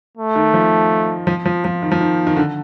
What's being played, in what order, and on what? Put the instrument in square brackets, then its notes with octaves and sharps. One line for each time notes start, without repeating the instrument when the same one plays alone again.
[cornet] A3
[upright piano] D#3
F3
F3
F3
F3
D#3
F3
D#3
D#3
D3